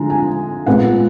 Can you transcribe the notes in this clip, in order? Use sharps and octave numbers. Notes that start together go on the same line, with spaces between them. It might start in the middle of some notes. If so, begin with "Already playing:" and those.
Already playing: D3 F3 G#3 A#5
G#5
A#2 G#3 B3 F#5